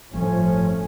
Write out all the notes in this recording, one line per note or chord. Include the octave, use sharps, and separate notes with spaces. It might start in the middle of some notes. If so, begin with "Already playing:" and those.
G1 A2 F3 A3 C#4